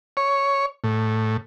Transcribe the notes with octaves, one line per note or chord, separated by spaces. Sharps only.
C#5
A2